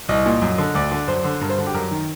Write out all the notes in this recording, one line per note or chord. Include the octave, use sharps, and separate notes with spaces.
C2 D#5
A#2
F#2
D3
D2 D5
D3
F#2 C5
D3
G2 A#4
C5
D3
G4
F#2 A#4
D#3